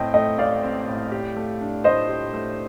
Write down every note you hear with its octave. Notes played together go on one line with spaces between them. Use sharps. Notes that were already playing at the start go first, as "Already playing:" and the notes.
Already playing: A2 C4 D#5 G5 A5
A3 D#5 G5
A1 D5 F5
C4
A2
G4
A3
D4
A2 C5 D#5
G4
A3